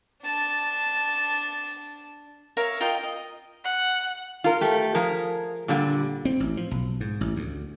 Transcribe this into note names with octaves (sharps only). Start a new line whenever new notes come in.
D4 A5
A#4 C#5 E5 F5
F4 A#4 D#5 G5
D#5
F#5
F4 A#4
A3 G4
F3 G#4 A#4
A#2 D3 G3
C4
A1
F3
B1
G#2
A1
D2